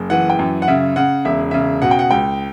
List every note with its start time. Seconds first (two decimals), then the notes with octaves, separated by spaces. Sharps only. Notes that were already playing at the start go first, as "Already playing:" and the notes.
Already playing: F#1
0.10 E3 F#5
0.30 G5
0.39 F#2
0.62 F#5
0.68 C#3 E5
0.96 C#3 F#5
1.25 E1 E5
1.51 C#3 E5
1.82 B2 F#5
1.91 G5
1.99 F#5
2.11 C#2 G5